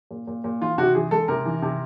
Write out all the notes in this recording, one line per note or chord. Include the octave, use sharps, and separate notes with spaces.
A#2
A#2
A#2
E3 F4
C3 F#4
E3 G#4
G#3 A4
C3 A#4
E3
C3